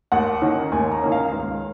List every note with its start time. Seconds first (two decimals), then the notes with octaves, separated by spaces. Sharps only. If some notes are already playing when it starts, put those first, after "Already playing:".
0.12 D#2 F#5
0.41 D#3 A#3 C#4
0.72 D#2 G#5
0.92 A#5
1.02 D#3 A#3 C#4
1.12 F5
1.32 C#2